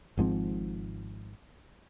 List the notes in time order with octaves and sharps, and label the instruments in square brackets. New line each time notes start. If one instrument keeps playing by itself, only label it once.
[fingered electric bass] G#1 G#2 F3 C4